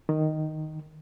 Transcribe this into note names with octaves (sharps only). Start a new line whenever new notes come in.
D#3